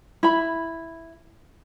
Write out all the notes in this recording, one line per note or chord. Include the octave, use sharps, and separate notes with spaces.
E4 B5